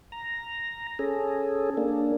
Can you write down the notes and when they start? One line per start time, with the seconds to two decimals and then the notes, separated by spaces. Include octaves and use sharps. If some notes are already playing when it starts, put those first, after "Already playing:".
0.12 A#5
0.99 C#4 G#4 A4
1.77 A#3 D4